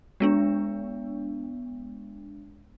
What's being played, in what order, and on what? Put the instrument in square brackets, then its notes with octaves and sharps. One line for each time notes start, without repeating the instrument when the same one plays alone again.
[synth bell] G#3 B3 D4